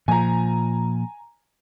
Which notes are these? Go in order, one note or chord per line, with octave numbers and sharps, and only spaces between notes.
A#2 F3 G#5 A#5